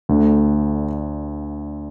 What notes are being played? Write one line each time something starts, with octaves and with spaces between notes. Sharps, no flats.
D2 D3 A3